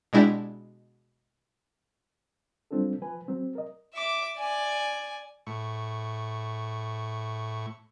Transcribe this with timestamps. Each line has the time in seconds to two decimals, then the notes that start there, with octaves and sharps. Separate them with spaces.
0.13 B2 G#3 D4 E4 G4
2.71 F#3 G3 C4 D4 F4 A4
3.02 F3 B4 G#5
3.28 F#3 C4
3.55 A#4 D#5
3.94 E5 D6
4.38 D5 G#5
5.47 A2 C#6